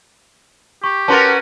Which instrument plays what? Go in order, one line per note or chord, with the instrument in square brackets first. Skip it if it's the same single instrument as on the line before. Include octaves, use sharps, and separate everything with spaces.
[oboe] G4 [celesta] C#6
[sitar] C#4 F#4 A#4 [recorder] B4 [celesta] A5 C6 A6